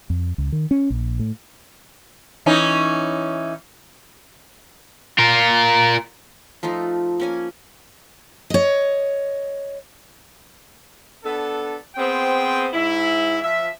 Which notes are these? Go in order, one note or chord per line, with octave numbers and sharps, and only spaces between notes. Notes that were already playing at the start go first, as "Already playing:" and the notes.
F2
C#2
D#3
C#4
A#1
A2
E3 C#4 D#4
F4 A#4
F3 A3 D#4 F4
A#3 C#4 G#5
C#5 D#5
B3 D4 A4
B3 C4 G#4 C5 G5
G#2 E4
F3 E5